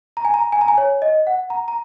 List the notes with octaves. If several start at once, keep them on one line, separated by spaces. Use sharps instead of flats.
A#5
G#5
A#5
G#5
A#5
G#5
C#5
D#5
F#5
A#5
A#5